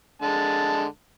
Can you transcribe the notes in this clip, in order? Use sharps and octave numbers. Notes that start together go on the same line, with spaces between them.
D3 G#3 A5